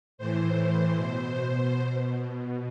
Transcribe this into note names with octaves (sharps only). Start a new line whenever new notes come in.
A2 E3 C5
B2
B2